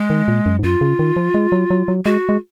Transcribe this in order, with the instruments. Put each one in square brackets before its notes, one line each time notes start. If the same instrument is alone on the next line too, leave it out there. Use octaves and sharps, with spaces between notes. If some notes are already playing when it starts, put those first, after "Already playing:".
Already playing: [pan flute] G#3
[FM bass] D#3
A#2
F#2
G#2
[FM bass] F#2 [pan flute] F4
[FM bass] C#3
D#3
F3
G#3
F#3
F#3
F#3
[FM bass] G#3 [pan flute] F#4
[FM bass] G#3